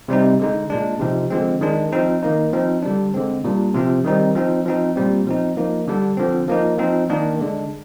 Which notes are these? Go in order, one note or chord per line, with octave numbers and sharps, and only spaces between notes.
C3 G3 C4 D#4
D3 G#3 D#4
A#2 G#3 D4
C3 F3 C4 D#4
D3 F3 G#3 C4
D#3 G#3 D4
F3 C4 D#4
D#3 A#3 D#4
F3 C4 D#4
D3 G3 D4
D3 G#3 C4
A#2 G3 D4
C3 F3 C4
D#3 G3 C4 D#4
F3 C4 D#4
F3 C4 D#4
A#2 G3 C4
F3 C4 D#4
F3 A#3 D#4
D3 G3 D4
D3 F3 C4
F3 A#3 D#4
F3 C4 D#4
D#3 A#3 D4
D3 G#3 D4